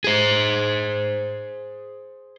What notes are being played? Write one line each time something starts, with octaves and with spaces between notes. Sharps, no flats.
G#4 C5